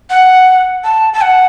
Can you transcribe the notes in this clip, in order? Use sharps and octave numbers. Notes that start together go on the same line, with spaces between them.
F#5
A5
A5
F#5